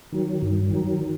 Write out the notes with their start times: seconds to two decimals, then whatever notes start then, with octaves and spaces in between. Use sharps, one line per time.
0.12 D#3 F#3
0.42 G2
0.71 D#3 F#3